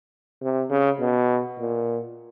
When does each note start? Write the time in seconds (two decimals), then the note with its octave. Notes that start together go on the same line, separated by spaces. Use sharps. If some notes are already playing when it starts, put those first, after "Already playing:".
0.42 C3
0.70 C#3
1.00 B2
1.59 A#2